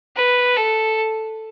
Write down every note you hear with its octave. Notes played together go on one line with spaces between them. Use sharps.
B4
A4